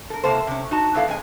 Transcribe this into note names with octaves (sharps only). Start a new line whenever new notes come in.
A4 A#4
C3 A#3 E4 A4 C5
C3 C#4
D#4 F#4 A5
G2 B3 E4 A4 F5
F2 G#3 G#5